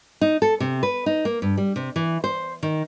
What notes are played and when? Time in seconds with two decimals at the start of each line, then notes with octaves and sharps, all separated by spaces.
0.21 D#4
0.42 A4
0.60 C3
0.83 B4
1.06 D#4
1.25 A#3
1.42 G2
1.57 G3
1.76 C3
1.96 E3
2.24 C5
2.63 D#3